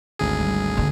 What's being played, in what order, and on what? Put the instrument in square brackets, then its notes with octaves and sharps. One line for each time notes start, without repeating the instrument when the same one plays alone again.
[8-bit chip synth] G#1 D2 G#4
[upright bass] G3
D3 A#3